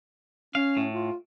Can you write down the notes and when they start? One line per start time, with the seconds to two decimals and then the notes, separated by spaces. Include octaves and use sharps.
0.55 C#4 F5
0.77 A2
0.93 F4